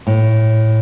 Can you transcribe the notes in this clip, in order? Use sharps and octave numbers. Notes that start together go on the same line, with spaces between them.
A2